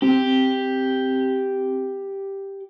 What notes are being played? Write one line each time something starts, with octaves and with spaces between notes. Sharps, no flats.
C4 G4